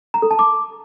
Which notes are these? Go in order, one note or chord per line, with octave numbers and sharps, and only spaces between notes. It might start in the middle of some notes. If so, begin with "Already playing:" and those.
A#5
A4
A5
D6